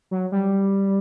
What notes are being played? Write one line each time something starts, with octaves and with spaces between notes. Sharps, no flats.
F#3
G3